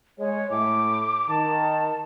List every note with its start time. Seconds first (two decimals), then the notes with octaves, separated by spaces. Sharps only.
0.19 G#3 C#5
0.50 A2 D6
1.29 D#3 A5